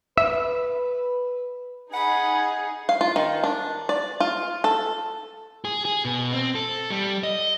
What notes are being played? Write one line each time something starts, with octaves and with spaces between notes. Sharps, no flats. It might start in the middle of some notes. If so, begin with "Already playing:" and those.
B4 E5
D#4 G#4 F#5 B5
F5
F4
D#3
D4
D5
F4
A4
G#4
G#4
B2
C4
A4
G3
D#5